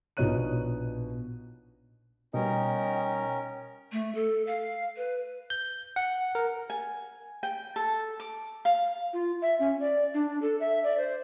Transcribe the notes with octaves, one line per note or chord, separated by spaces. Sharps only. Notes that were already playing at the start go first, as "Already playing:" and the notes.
A#1 B2 D#4 C#5 F#6 D#7
B2 G3 C#4 D#4 A#4 G5
A3
A4
F5
B4
G6
F#5
A#4
G#5
G5
A4
D6
F5
F4
E5
C#4
D5
D4
A4
E5
D5
C5